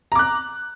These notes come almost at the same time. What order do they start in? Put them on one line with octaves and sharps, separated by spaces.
A#5 D6 F#6